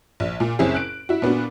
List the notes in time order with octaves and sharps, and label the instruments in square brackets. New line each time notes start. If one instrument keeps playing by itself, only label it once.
[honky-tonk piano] A#1
A#2
F#1 C4 C#4 E4 G#4
F#6 D7
E4 F#4
A#2 B3 D4 F#4